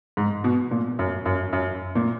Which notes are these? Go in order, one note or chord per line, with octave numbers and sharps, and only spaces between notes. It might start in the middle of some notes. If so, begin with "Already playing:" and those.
G#2
B2
A#2
F#2
F#2
F#2
A#2